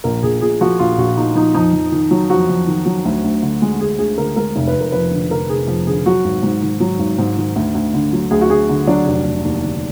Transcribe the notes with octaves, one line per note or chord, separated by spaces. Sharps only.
A#1 A#4
A#1 G#4
A#2 G#4
F3 F#4
A#1 F4
A#1 F#4
A#2 D#4
F3 D#4
F2 D#4
F2
D#3
F#3
F2 F#4
F2
D#3
F#3
D2
D2
D3
G#3
D2 G#4
D2 G#4
D3 A#4
G#3 A#4
F1
B4
F1
A#4
F2 B4
D3
F1 A#4
F1 G#4
F2
D3 G#4
F#3 F#4
G#1
G#2
D#3
F#3
G#1
G#2
D#3
D2
D2
D3
F#3
D2 G#4
F#4
D2 G#4
D3
F#3 D4
F1
F1
D#2
D3